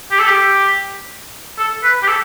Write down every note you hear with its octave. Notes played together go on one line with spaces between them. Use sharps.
G4
A4
G4
A4
B4
G4
A4